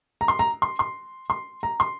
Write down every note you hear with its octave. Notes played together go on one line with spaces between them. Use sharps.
A#5
C6
A#5
C6
C6
C6
A#5
C6